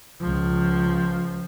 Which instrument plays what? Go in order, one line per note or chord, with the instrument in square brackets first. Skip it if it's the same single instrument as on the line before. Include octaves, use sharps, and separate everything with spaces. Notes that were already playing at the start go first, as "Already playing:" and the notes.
[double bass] C#2 F3